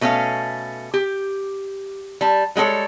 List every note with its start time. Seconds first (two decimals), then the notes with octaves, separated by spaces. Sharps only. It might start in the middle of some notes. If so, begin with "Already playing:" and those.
0.01 B2 A3 C#4 D#4 F5
0.94 G4
2.21 G3 A5
2.56 G3 G#3 G4 A4 C#5